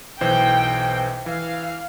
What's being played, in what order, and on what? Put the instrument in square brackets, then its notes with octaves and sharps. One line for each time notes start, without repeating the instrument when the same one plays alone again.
[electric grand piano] B1 E3 C5 [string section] G5
[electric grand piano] E3 [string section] F5